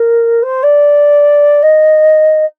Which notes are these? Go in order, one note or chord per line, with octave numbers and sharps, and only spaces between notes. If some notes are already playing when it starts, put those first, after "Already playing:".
Already playing: A#4
C5
D5
D#5